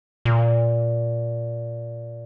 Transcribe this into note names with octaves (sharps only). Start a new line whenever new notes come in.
A#2